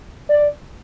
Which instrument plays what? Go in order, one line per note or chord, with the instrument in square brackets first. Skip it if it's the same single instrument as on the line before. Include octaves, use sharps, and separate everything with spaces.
[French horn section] D5